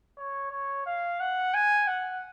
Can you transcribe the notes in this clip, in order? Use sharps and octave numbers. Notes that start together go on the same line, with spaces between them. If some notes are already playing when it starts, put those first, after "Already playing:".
C#5
C#5
F5
F#5
G#5
F#5